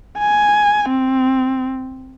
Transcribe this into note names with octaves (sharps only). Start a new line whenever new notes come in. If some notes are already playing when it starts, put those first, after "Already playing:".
G#5
C4